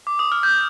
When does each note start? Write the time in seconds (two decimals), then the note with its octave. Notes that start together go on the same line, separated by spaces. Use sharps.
0.07 D6
0.19 D#6
0.32 F6
0.43 G6